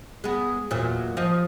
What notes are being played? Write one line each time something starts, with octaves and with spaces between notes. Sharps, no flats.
G#3 B3
E2 A#2 F#3
F3 D#5